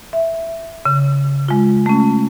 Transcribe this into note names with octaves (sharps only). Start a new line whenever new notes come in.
E5
C#3
G#3 F4
A3 C#4